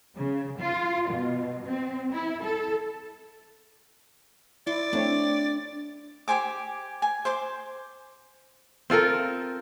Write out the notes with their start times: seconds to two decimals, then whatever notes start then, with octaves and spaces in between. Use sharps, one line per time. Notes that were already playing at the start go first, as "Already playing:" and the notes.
0.16 C#3
0.59 F4
1.09 B2
1.65 C4
2.12 E4
2.43 A4
4.67 E4 D5 C6
4.93 A3 C4 D4 C#5
6.28 G4 C5 G#5 D6
7.02 G#5
7.25 C5 C6 D6
8.90 C4 F4 A4 A#4